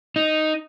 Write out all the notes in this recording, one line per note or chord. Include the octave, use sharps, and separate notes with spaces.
D#4